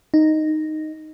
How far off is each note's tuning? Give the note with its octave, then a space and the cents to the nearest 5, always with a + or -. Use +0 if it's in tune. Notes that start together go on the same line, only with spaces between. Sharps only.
D#4 -5